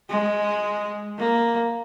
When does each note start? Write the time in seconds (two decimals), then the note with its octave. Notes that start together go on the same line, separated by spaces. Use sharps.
0.10 G#3
1.19 A#3